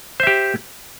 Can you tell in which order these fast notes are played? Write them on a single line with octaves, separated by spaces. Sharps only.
C5 E5 G4